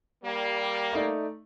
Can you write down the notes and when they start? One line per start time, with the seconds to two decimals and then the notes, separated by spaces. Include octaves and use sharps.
0.25 G3 A#3
0.93 A3 D#4 D5